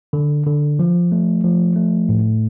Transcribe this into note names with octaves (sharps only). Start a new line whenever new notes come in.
D3
D3
F3
A3
F3
A3
A2